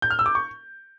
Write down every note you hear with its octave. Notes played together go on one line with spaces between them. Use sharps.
G6
F6
E6
D6
C#6